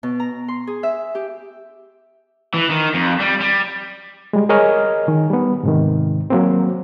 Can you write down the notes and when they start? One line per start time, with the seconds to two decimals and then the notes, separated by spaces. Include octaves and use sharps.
0.03 B2
0.20 A#5
0.48 C6
0.67 G#4
0.83 E5
1.15 G4
2.54 E3
2.70 D#3
2.94 F2
3.20 G3
3.41 G3
4.33 G3 G#3
4.49 G#4 A#4 C#5 D#5 G#5 F6
5.08 D#3
5.30 G3 B3
5.63 G#2 C3 D#3
6.30 F#3 A#3 C4